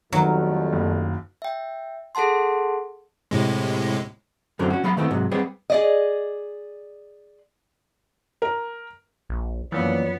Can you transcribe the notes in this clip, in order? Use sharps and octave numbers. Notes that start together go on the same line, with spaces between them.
F2 D#3 F#3 G3 A3 B3 F#4 A#4
F#1 A#3
E5 G5
G#4 A4 F#5 A5 C6
A2 C3 G#3
F#2 A2 D3 F#3 C4
C#4 F#4
F#3 B3 F5 B5
D#3 A3 B3 C4 E4
G#2 C3 F#3
G3 B3 C4 G#4 C#5
G#4 D5 D#5
A#4
A#1
F#2 E3 F3 A#3 B3 C#5 D5